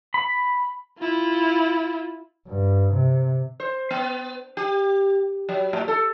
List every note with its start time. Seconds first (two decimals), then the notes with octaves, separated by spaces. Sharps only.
0.14 B5
0.99 E4 F4
2.48 G2
2.94 C3
3.60 C5
3.91 B3
4.57 G4
5.49 F#3
5.73 A2
5.88 A4